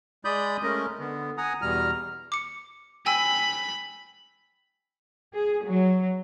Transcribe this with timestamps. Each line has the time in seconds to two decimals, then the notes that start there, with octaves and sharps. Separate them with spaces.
0.25 G#3 D5 B5 D#6 G6
0.63 G#3 A3 C#4 A#4 D#5
0.99 D3 B3
1.38 F#5 G#5 A#5 D#6
1.62 E2 B2 G3 A#5 F6
2.32 D6 C#7
3.06 G5 G#5 B5 E6
5.34 G#4
5.65 F#3